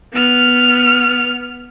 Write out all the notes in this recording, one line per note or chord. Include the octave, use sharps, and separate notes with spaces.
B3 F6